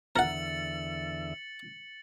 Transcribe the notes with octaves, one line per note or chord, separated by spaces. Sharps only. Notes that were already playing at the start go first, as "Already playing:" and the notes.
E2 D3 A#4 E5 F#5 A6 C#7 F#7